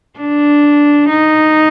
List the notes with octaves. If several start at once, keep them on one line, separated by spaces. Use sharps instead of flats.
D4
D#4